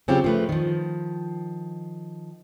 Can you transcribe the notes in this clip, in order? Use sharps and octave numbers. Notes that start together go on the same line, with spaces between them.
C#3 F#3 C4 C#4 F4 G4
F3 A3 B4
D#3 F3